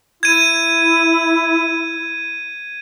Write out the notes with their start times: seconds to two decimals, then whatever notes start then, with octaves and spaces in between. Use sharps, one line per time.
0.23 E4 G#6 D#7